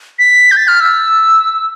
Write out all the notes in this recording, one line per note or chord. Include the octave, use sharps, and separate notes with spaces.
B6
G6
A6
F6
E6